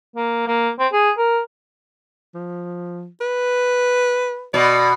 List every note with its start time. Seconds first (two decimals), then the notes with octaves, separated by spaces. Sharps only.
0.16 A#3
0.48 A#3
0.79 C4
0.93 G#4
1.18 A#4
2.34 F3
3.21 B4
4.54 B2 D5